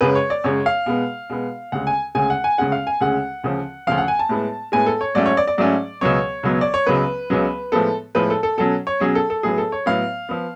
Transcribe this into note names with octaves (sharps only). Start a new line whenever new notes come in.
F#2 C#3 G#3 B4
C#5
D5
F#2 C#3 G#3 C#5
F5
B2 G#3 B3
B2 G#3 B3
D2 C#3 G#3 F#5
G#5
D2 C#3 G#3 G#5
F#5
G#5
D2 C#3 G#3 C#4 F#5
F5
G#5
D2 C#3 G#3 C#4 F#5
D2 C#3 F3
D2 C#3 F3 F5
F#5
G#5
A5
A2 G#3 B3
A2 G#3 B3 G#5
A4
C#5
G#2 F#3 A3 C#4 D5
C#5
D5
D5
G#2 F#3 A3 C#4 D5
C#2 B2 F#3 B3 C#5
C#2 B2 F#3 B3
D5
C#5
C#2 C#3 F#3 B3 B4
C#2 C#3 F#3 B3
A2 F3 G#3 B3 A4
A2 F3 G#3 B3 B4
A4
A4
B2 F#3 C#4 A4
C#5
B2 F#3 C#4 G#4
A4
A4
A2 F#3 B3 G#4
A4
C#5
A2 F#3 B3 F5
F3 B3